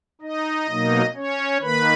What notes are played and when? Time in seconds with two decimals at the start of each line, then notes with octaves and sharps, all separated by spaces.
0.21 D#4 D#5
0.68 B2 F#3 A#3 D#4
1.16 C#4 C#5
1.62 D#3 A#3 B4 B5